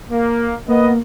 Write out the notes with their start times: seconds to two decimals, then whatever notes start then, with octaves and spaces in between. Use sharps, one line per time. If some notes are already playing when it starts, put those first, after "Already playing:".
0.10 A#3
0.68 A#3 B3 D#5